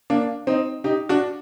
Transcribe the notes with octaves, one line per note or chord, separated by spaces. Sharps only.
A#3 D4
C4 D#4
D#4 G4
D4 F#4